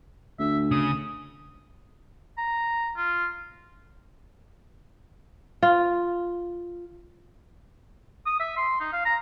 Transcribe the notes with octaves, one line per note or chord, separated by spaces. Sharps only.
D2 E5
C#3 D#6
A#5
F4
F4
D#6
E5
C6
D#4
F5
A#5